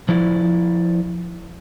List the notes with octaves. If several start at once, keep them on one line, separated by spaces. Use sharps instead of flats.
F3 E4 D5